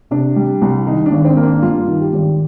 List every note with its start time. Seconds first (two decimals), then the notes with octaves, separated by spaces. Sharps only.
0.11 C3 D4
0.36 G3
0.61 C2
0.87 D#3 D#4
1.06 D4
1.12 G#1
1.24 C4
1.37 A#3
1.43 D4
1.62 G2 F4
1.87 D#3
2.00 G4
2.13 G#1